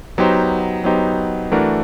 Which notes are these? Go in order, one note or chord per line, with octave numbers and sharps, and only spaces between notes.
F#3 B3 D#4 G4 C5
F#3 B3 D#4 G4 C5
E3 A3 D4 F#4 A#4